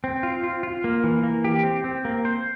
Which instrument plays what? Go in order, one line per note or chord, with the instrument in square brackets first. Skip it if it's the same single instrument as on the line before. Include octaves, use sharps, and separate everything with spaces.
[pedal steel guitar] C4
F4
F4
F4
A#3
E3
A#3
G4
C4
C4
A#3
C5